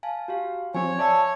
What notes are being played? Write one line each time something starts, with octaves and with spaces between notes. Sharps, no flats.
F5 G#5 A5
F#4 G4 F5
F3 C4 C#5 G#5
D5 E5 A5 E6